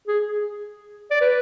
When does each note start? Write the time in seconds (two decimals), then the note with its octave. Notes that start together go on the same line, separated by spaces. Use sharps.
0.07 G#4
1.11 D5
1.21 B4